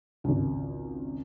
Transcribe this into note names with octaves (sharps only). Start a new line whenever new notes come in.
G#1 C#2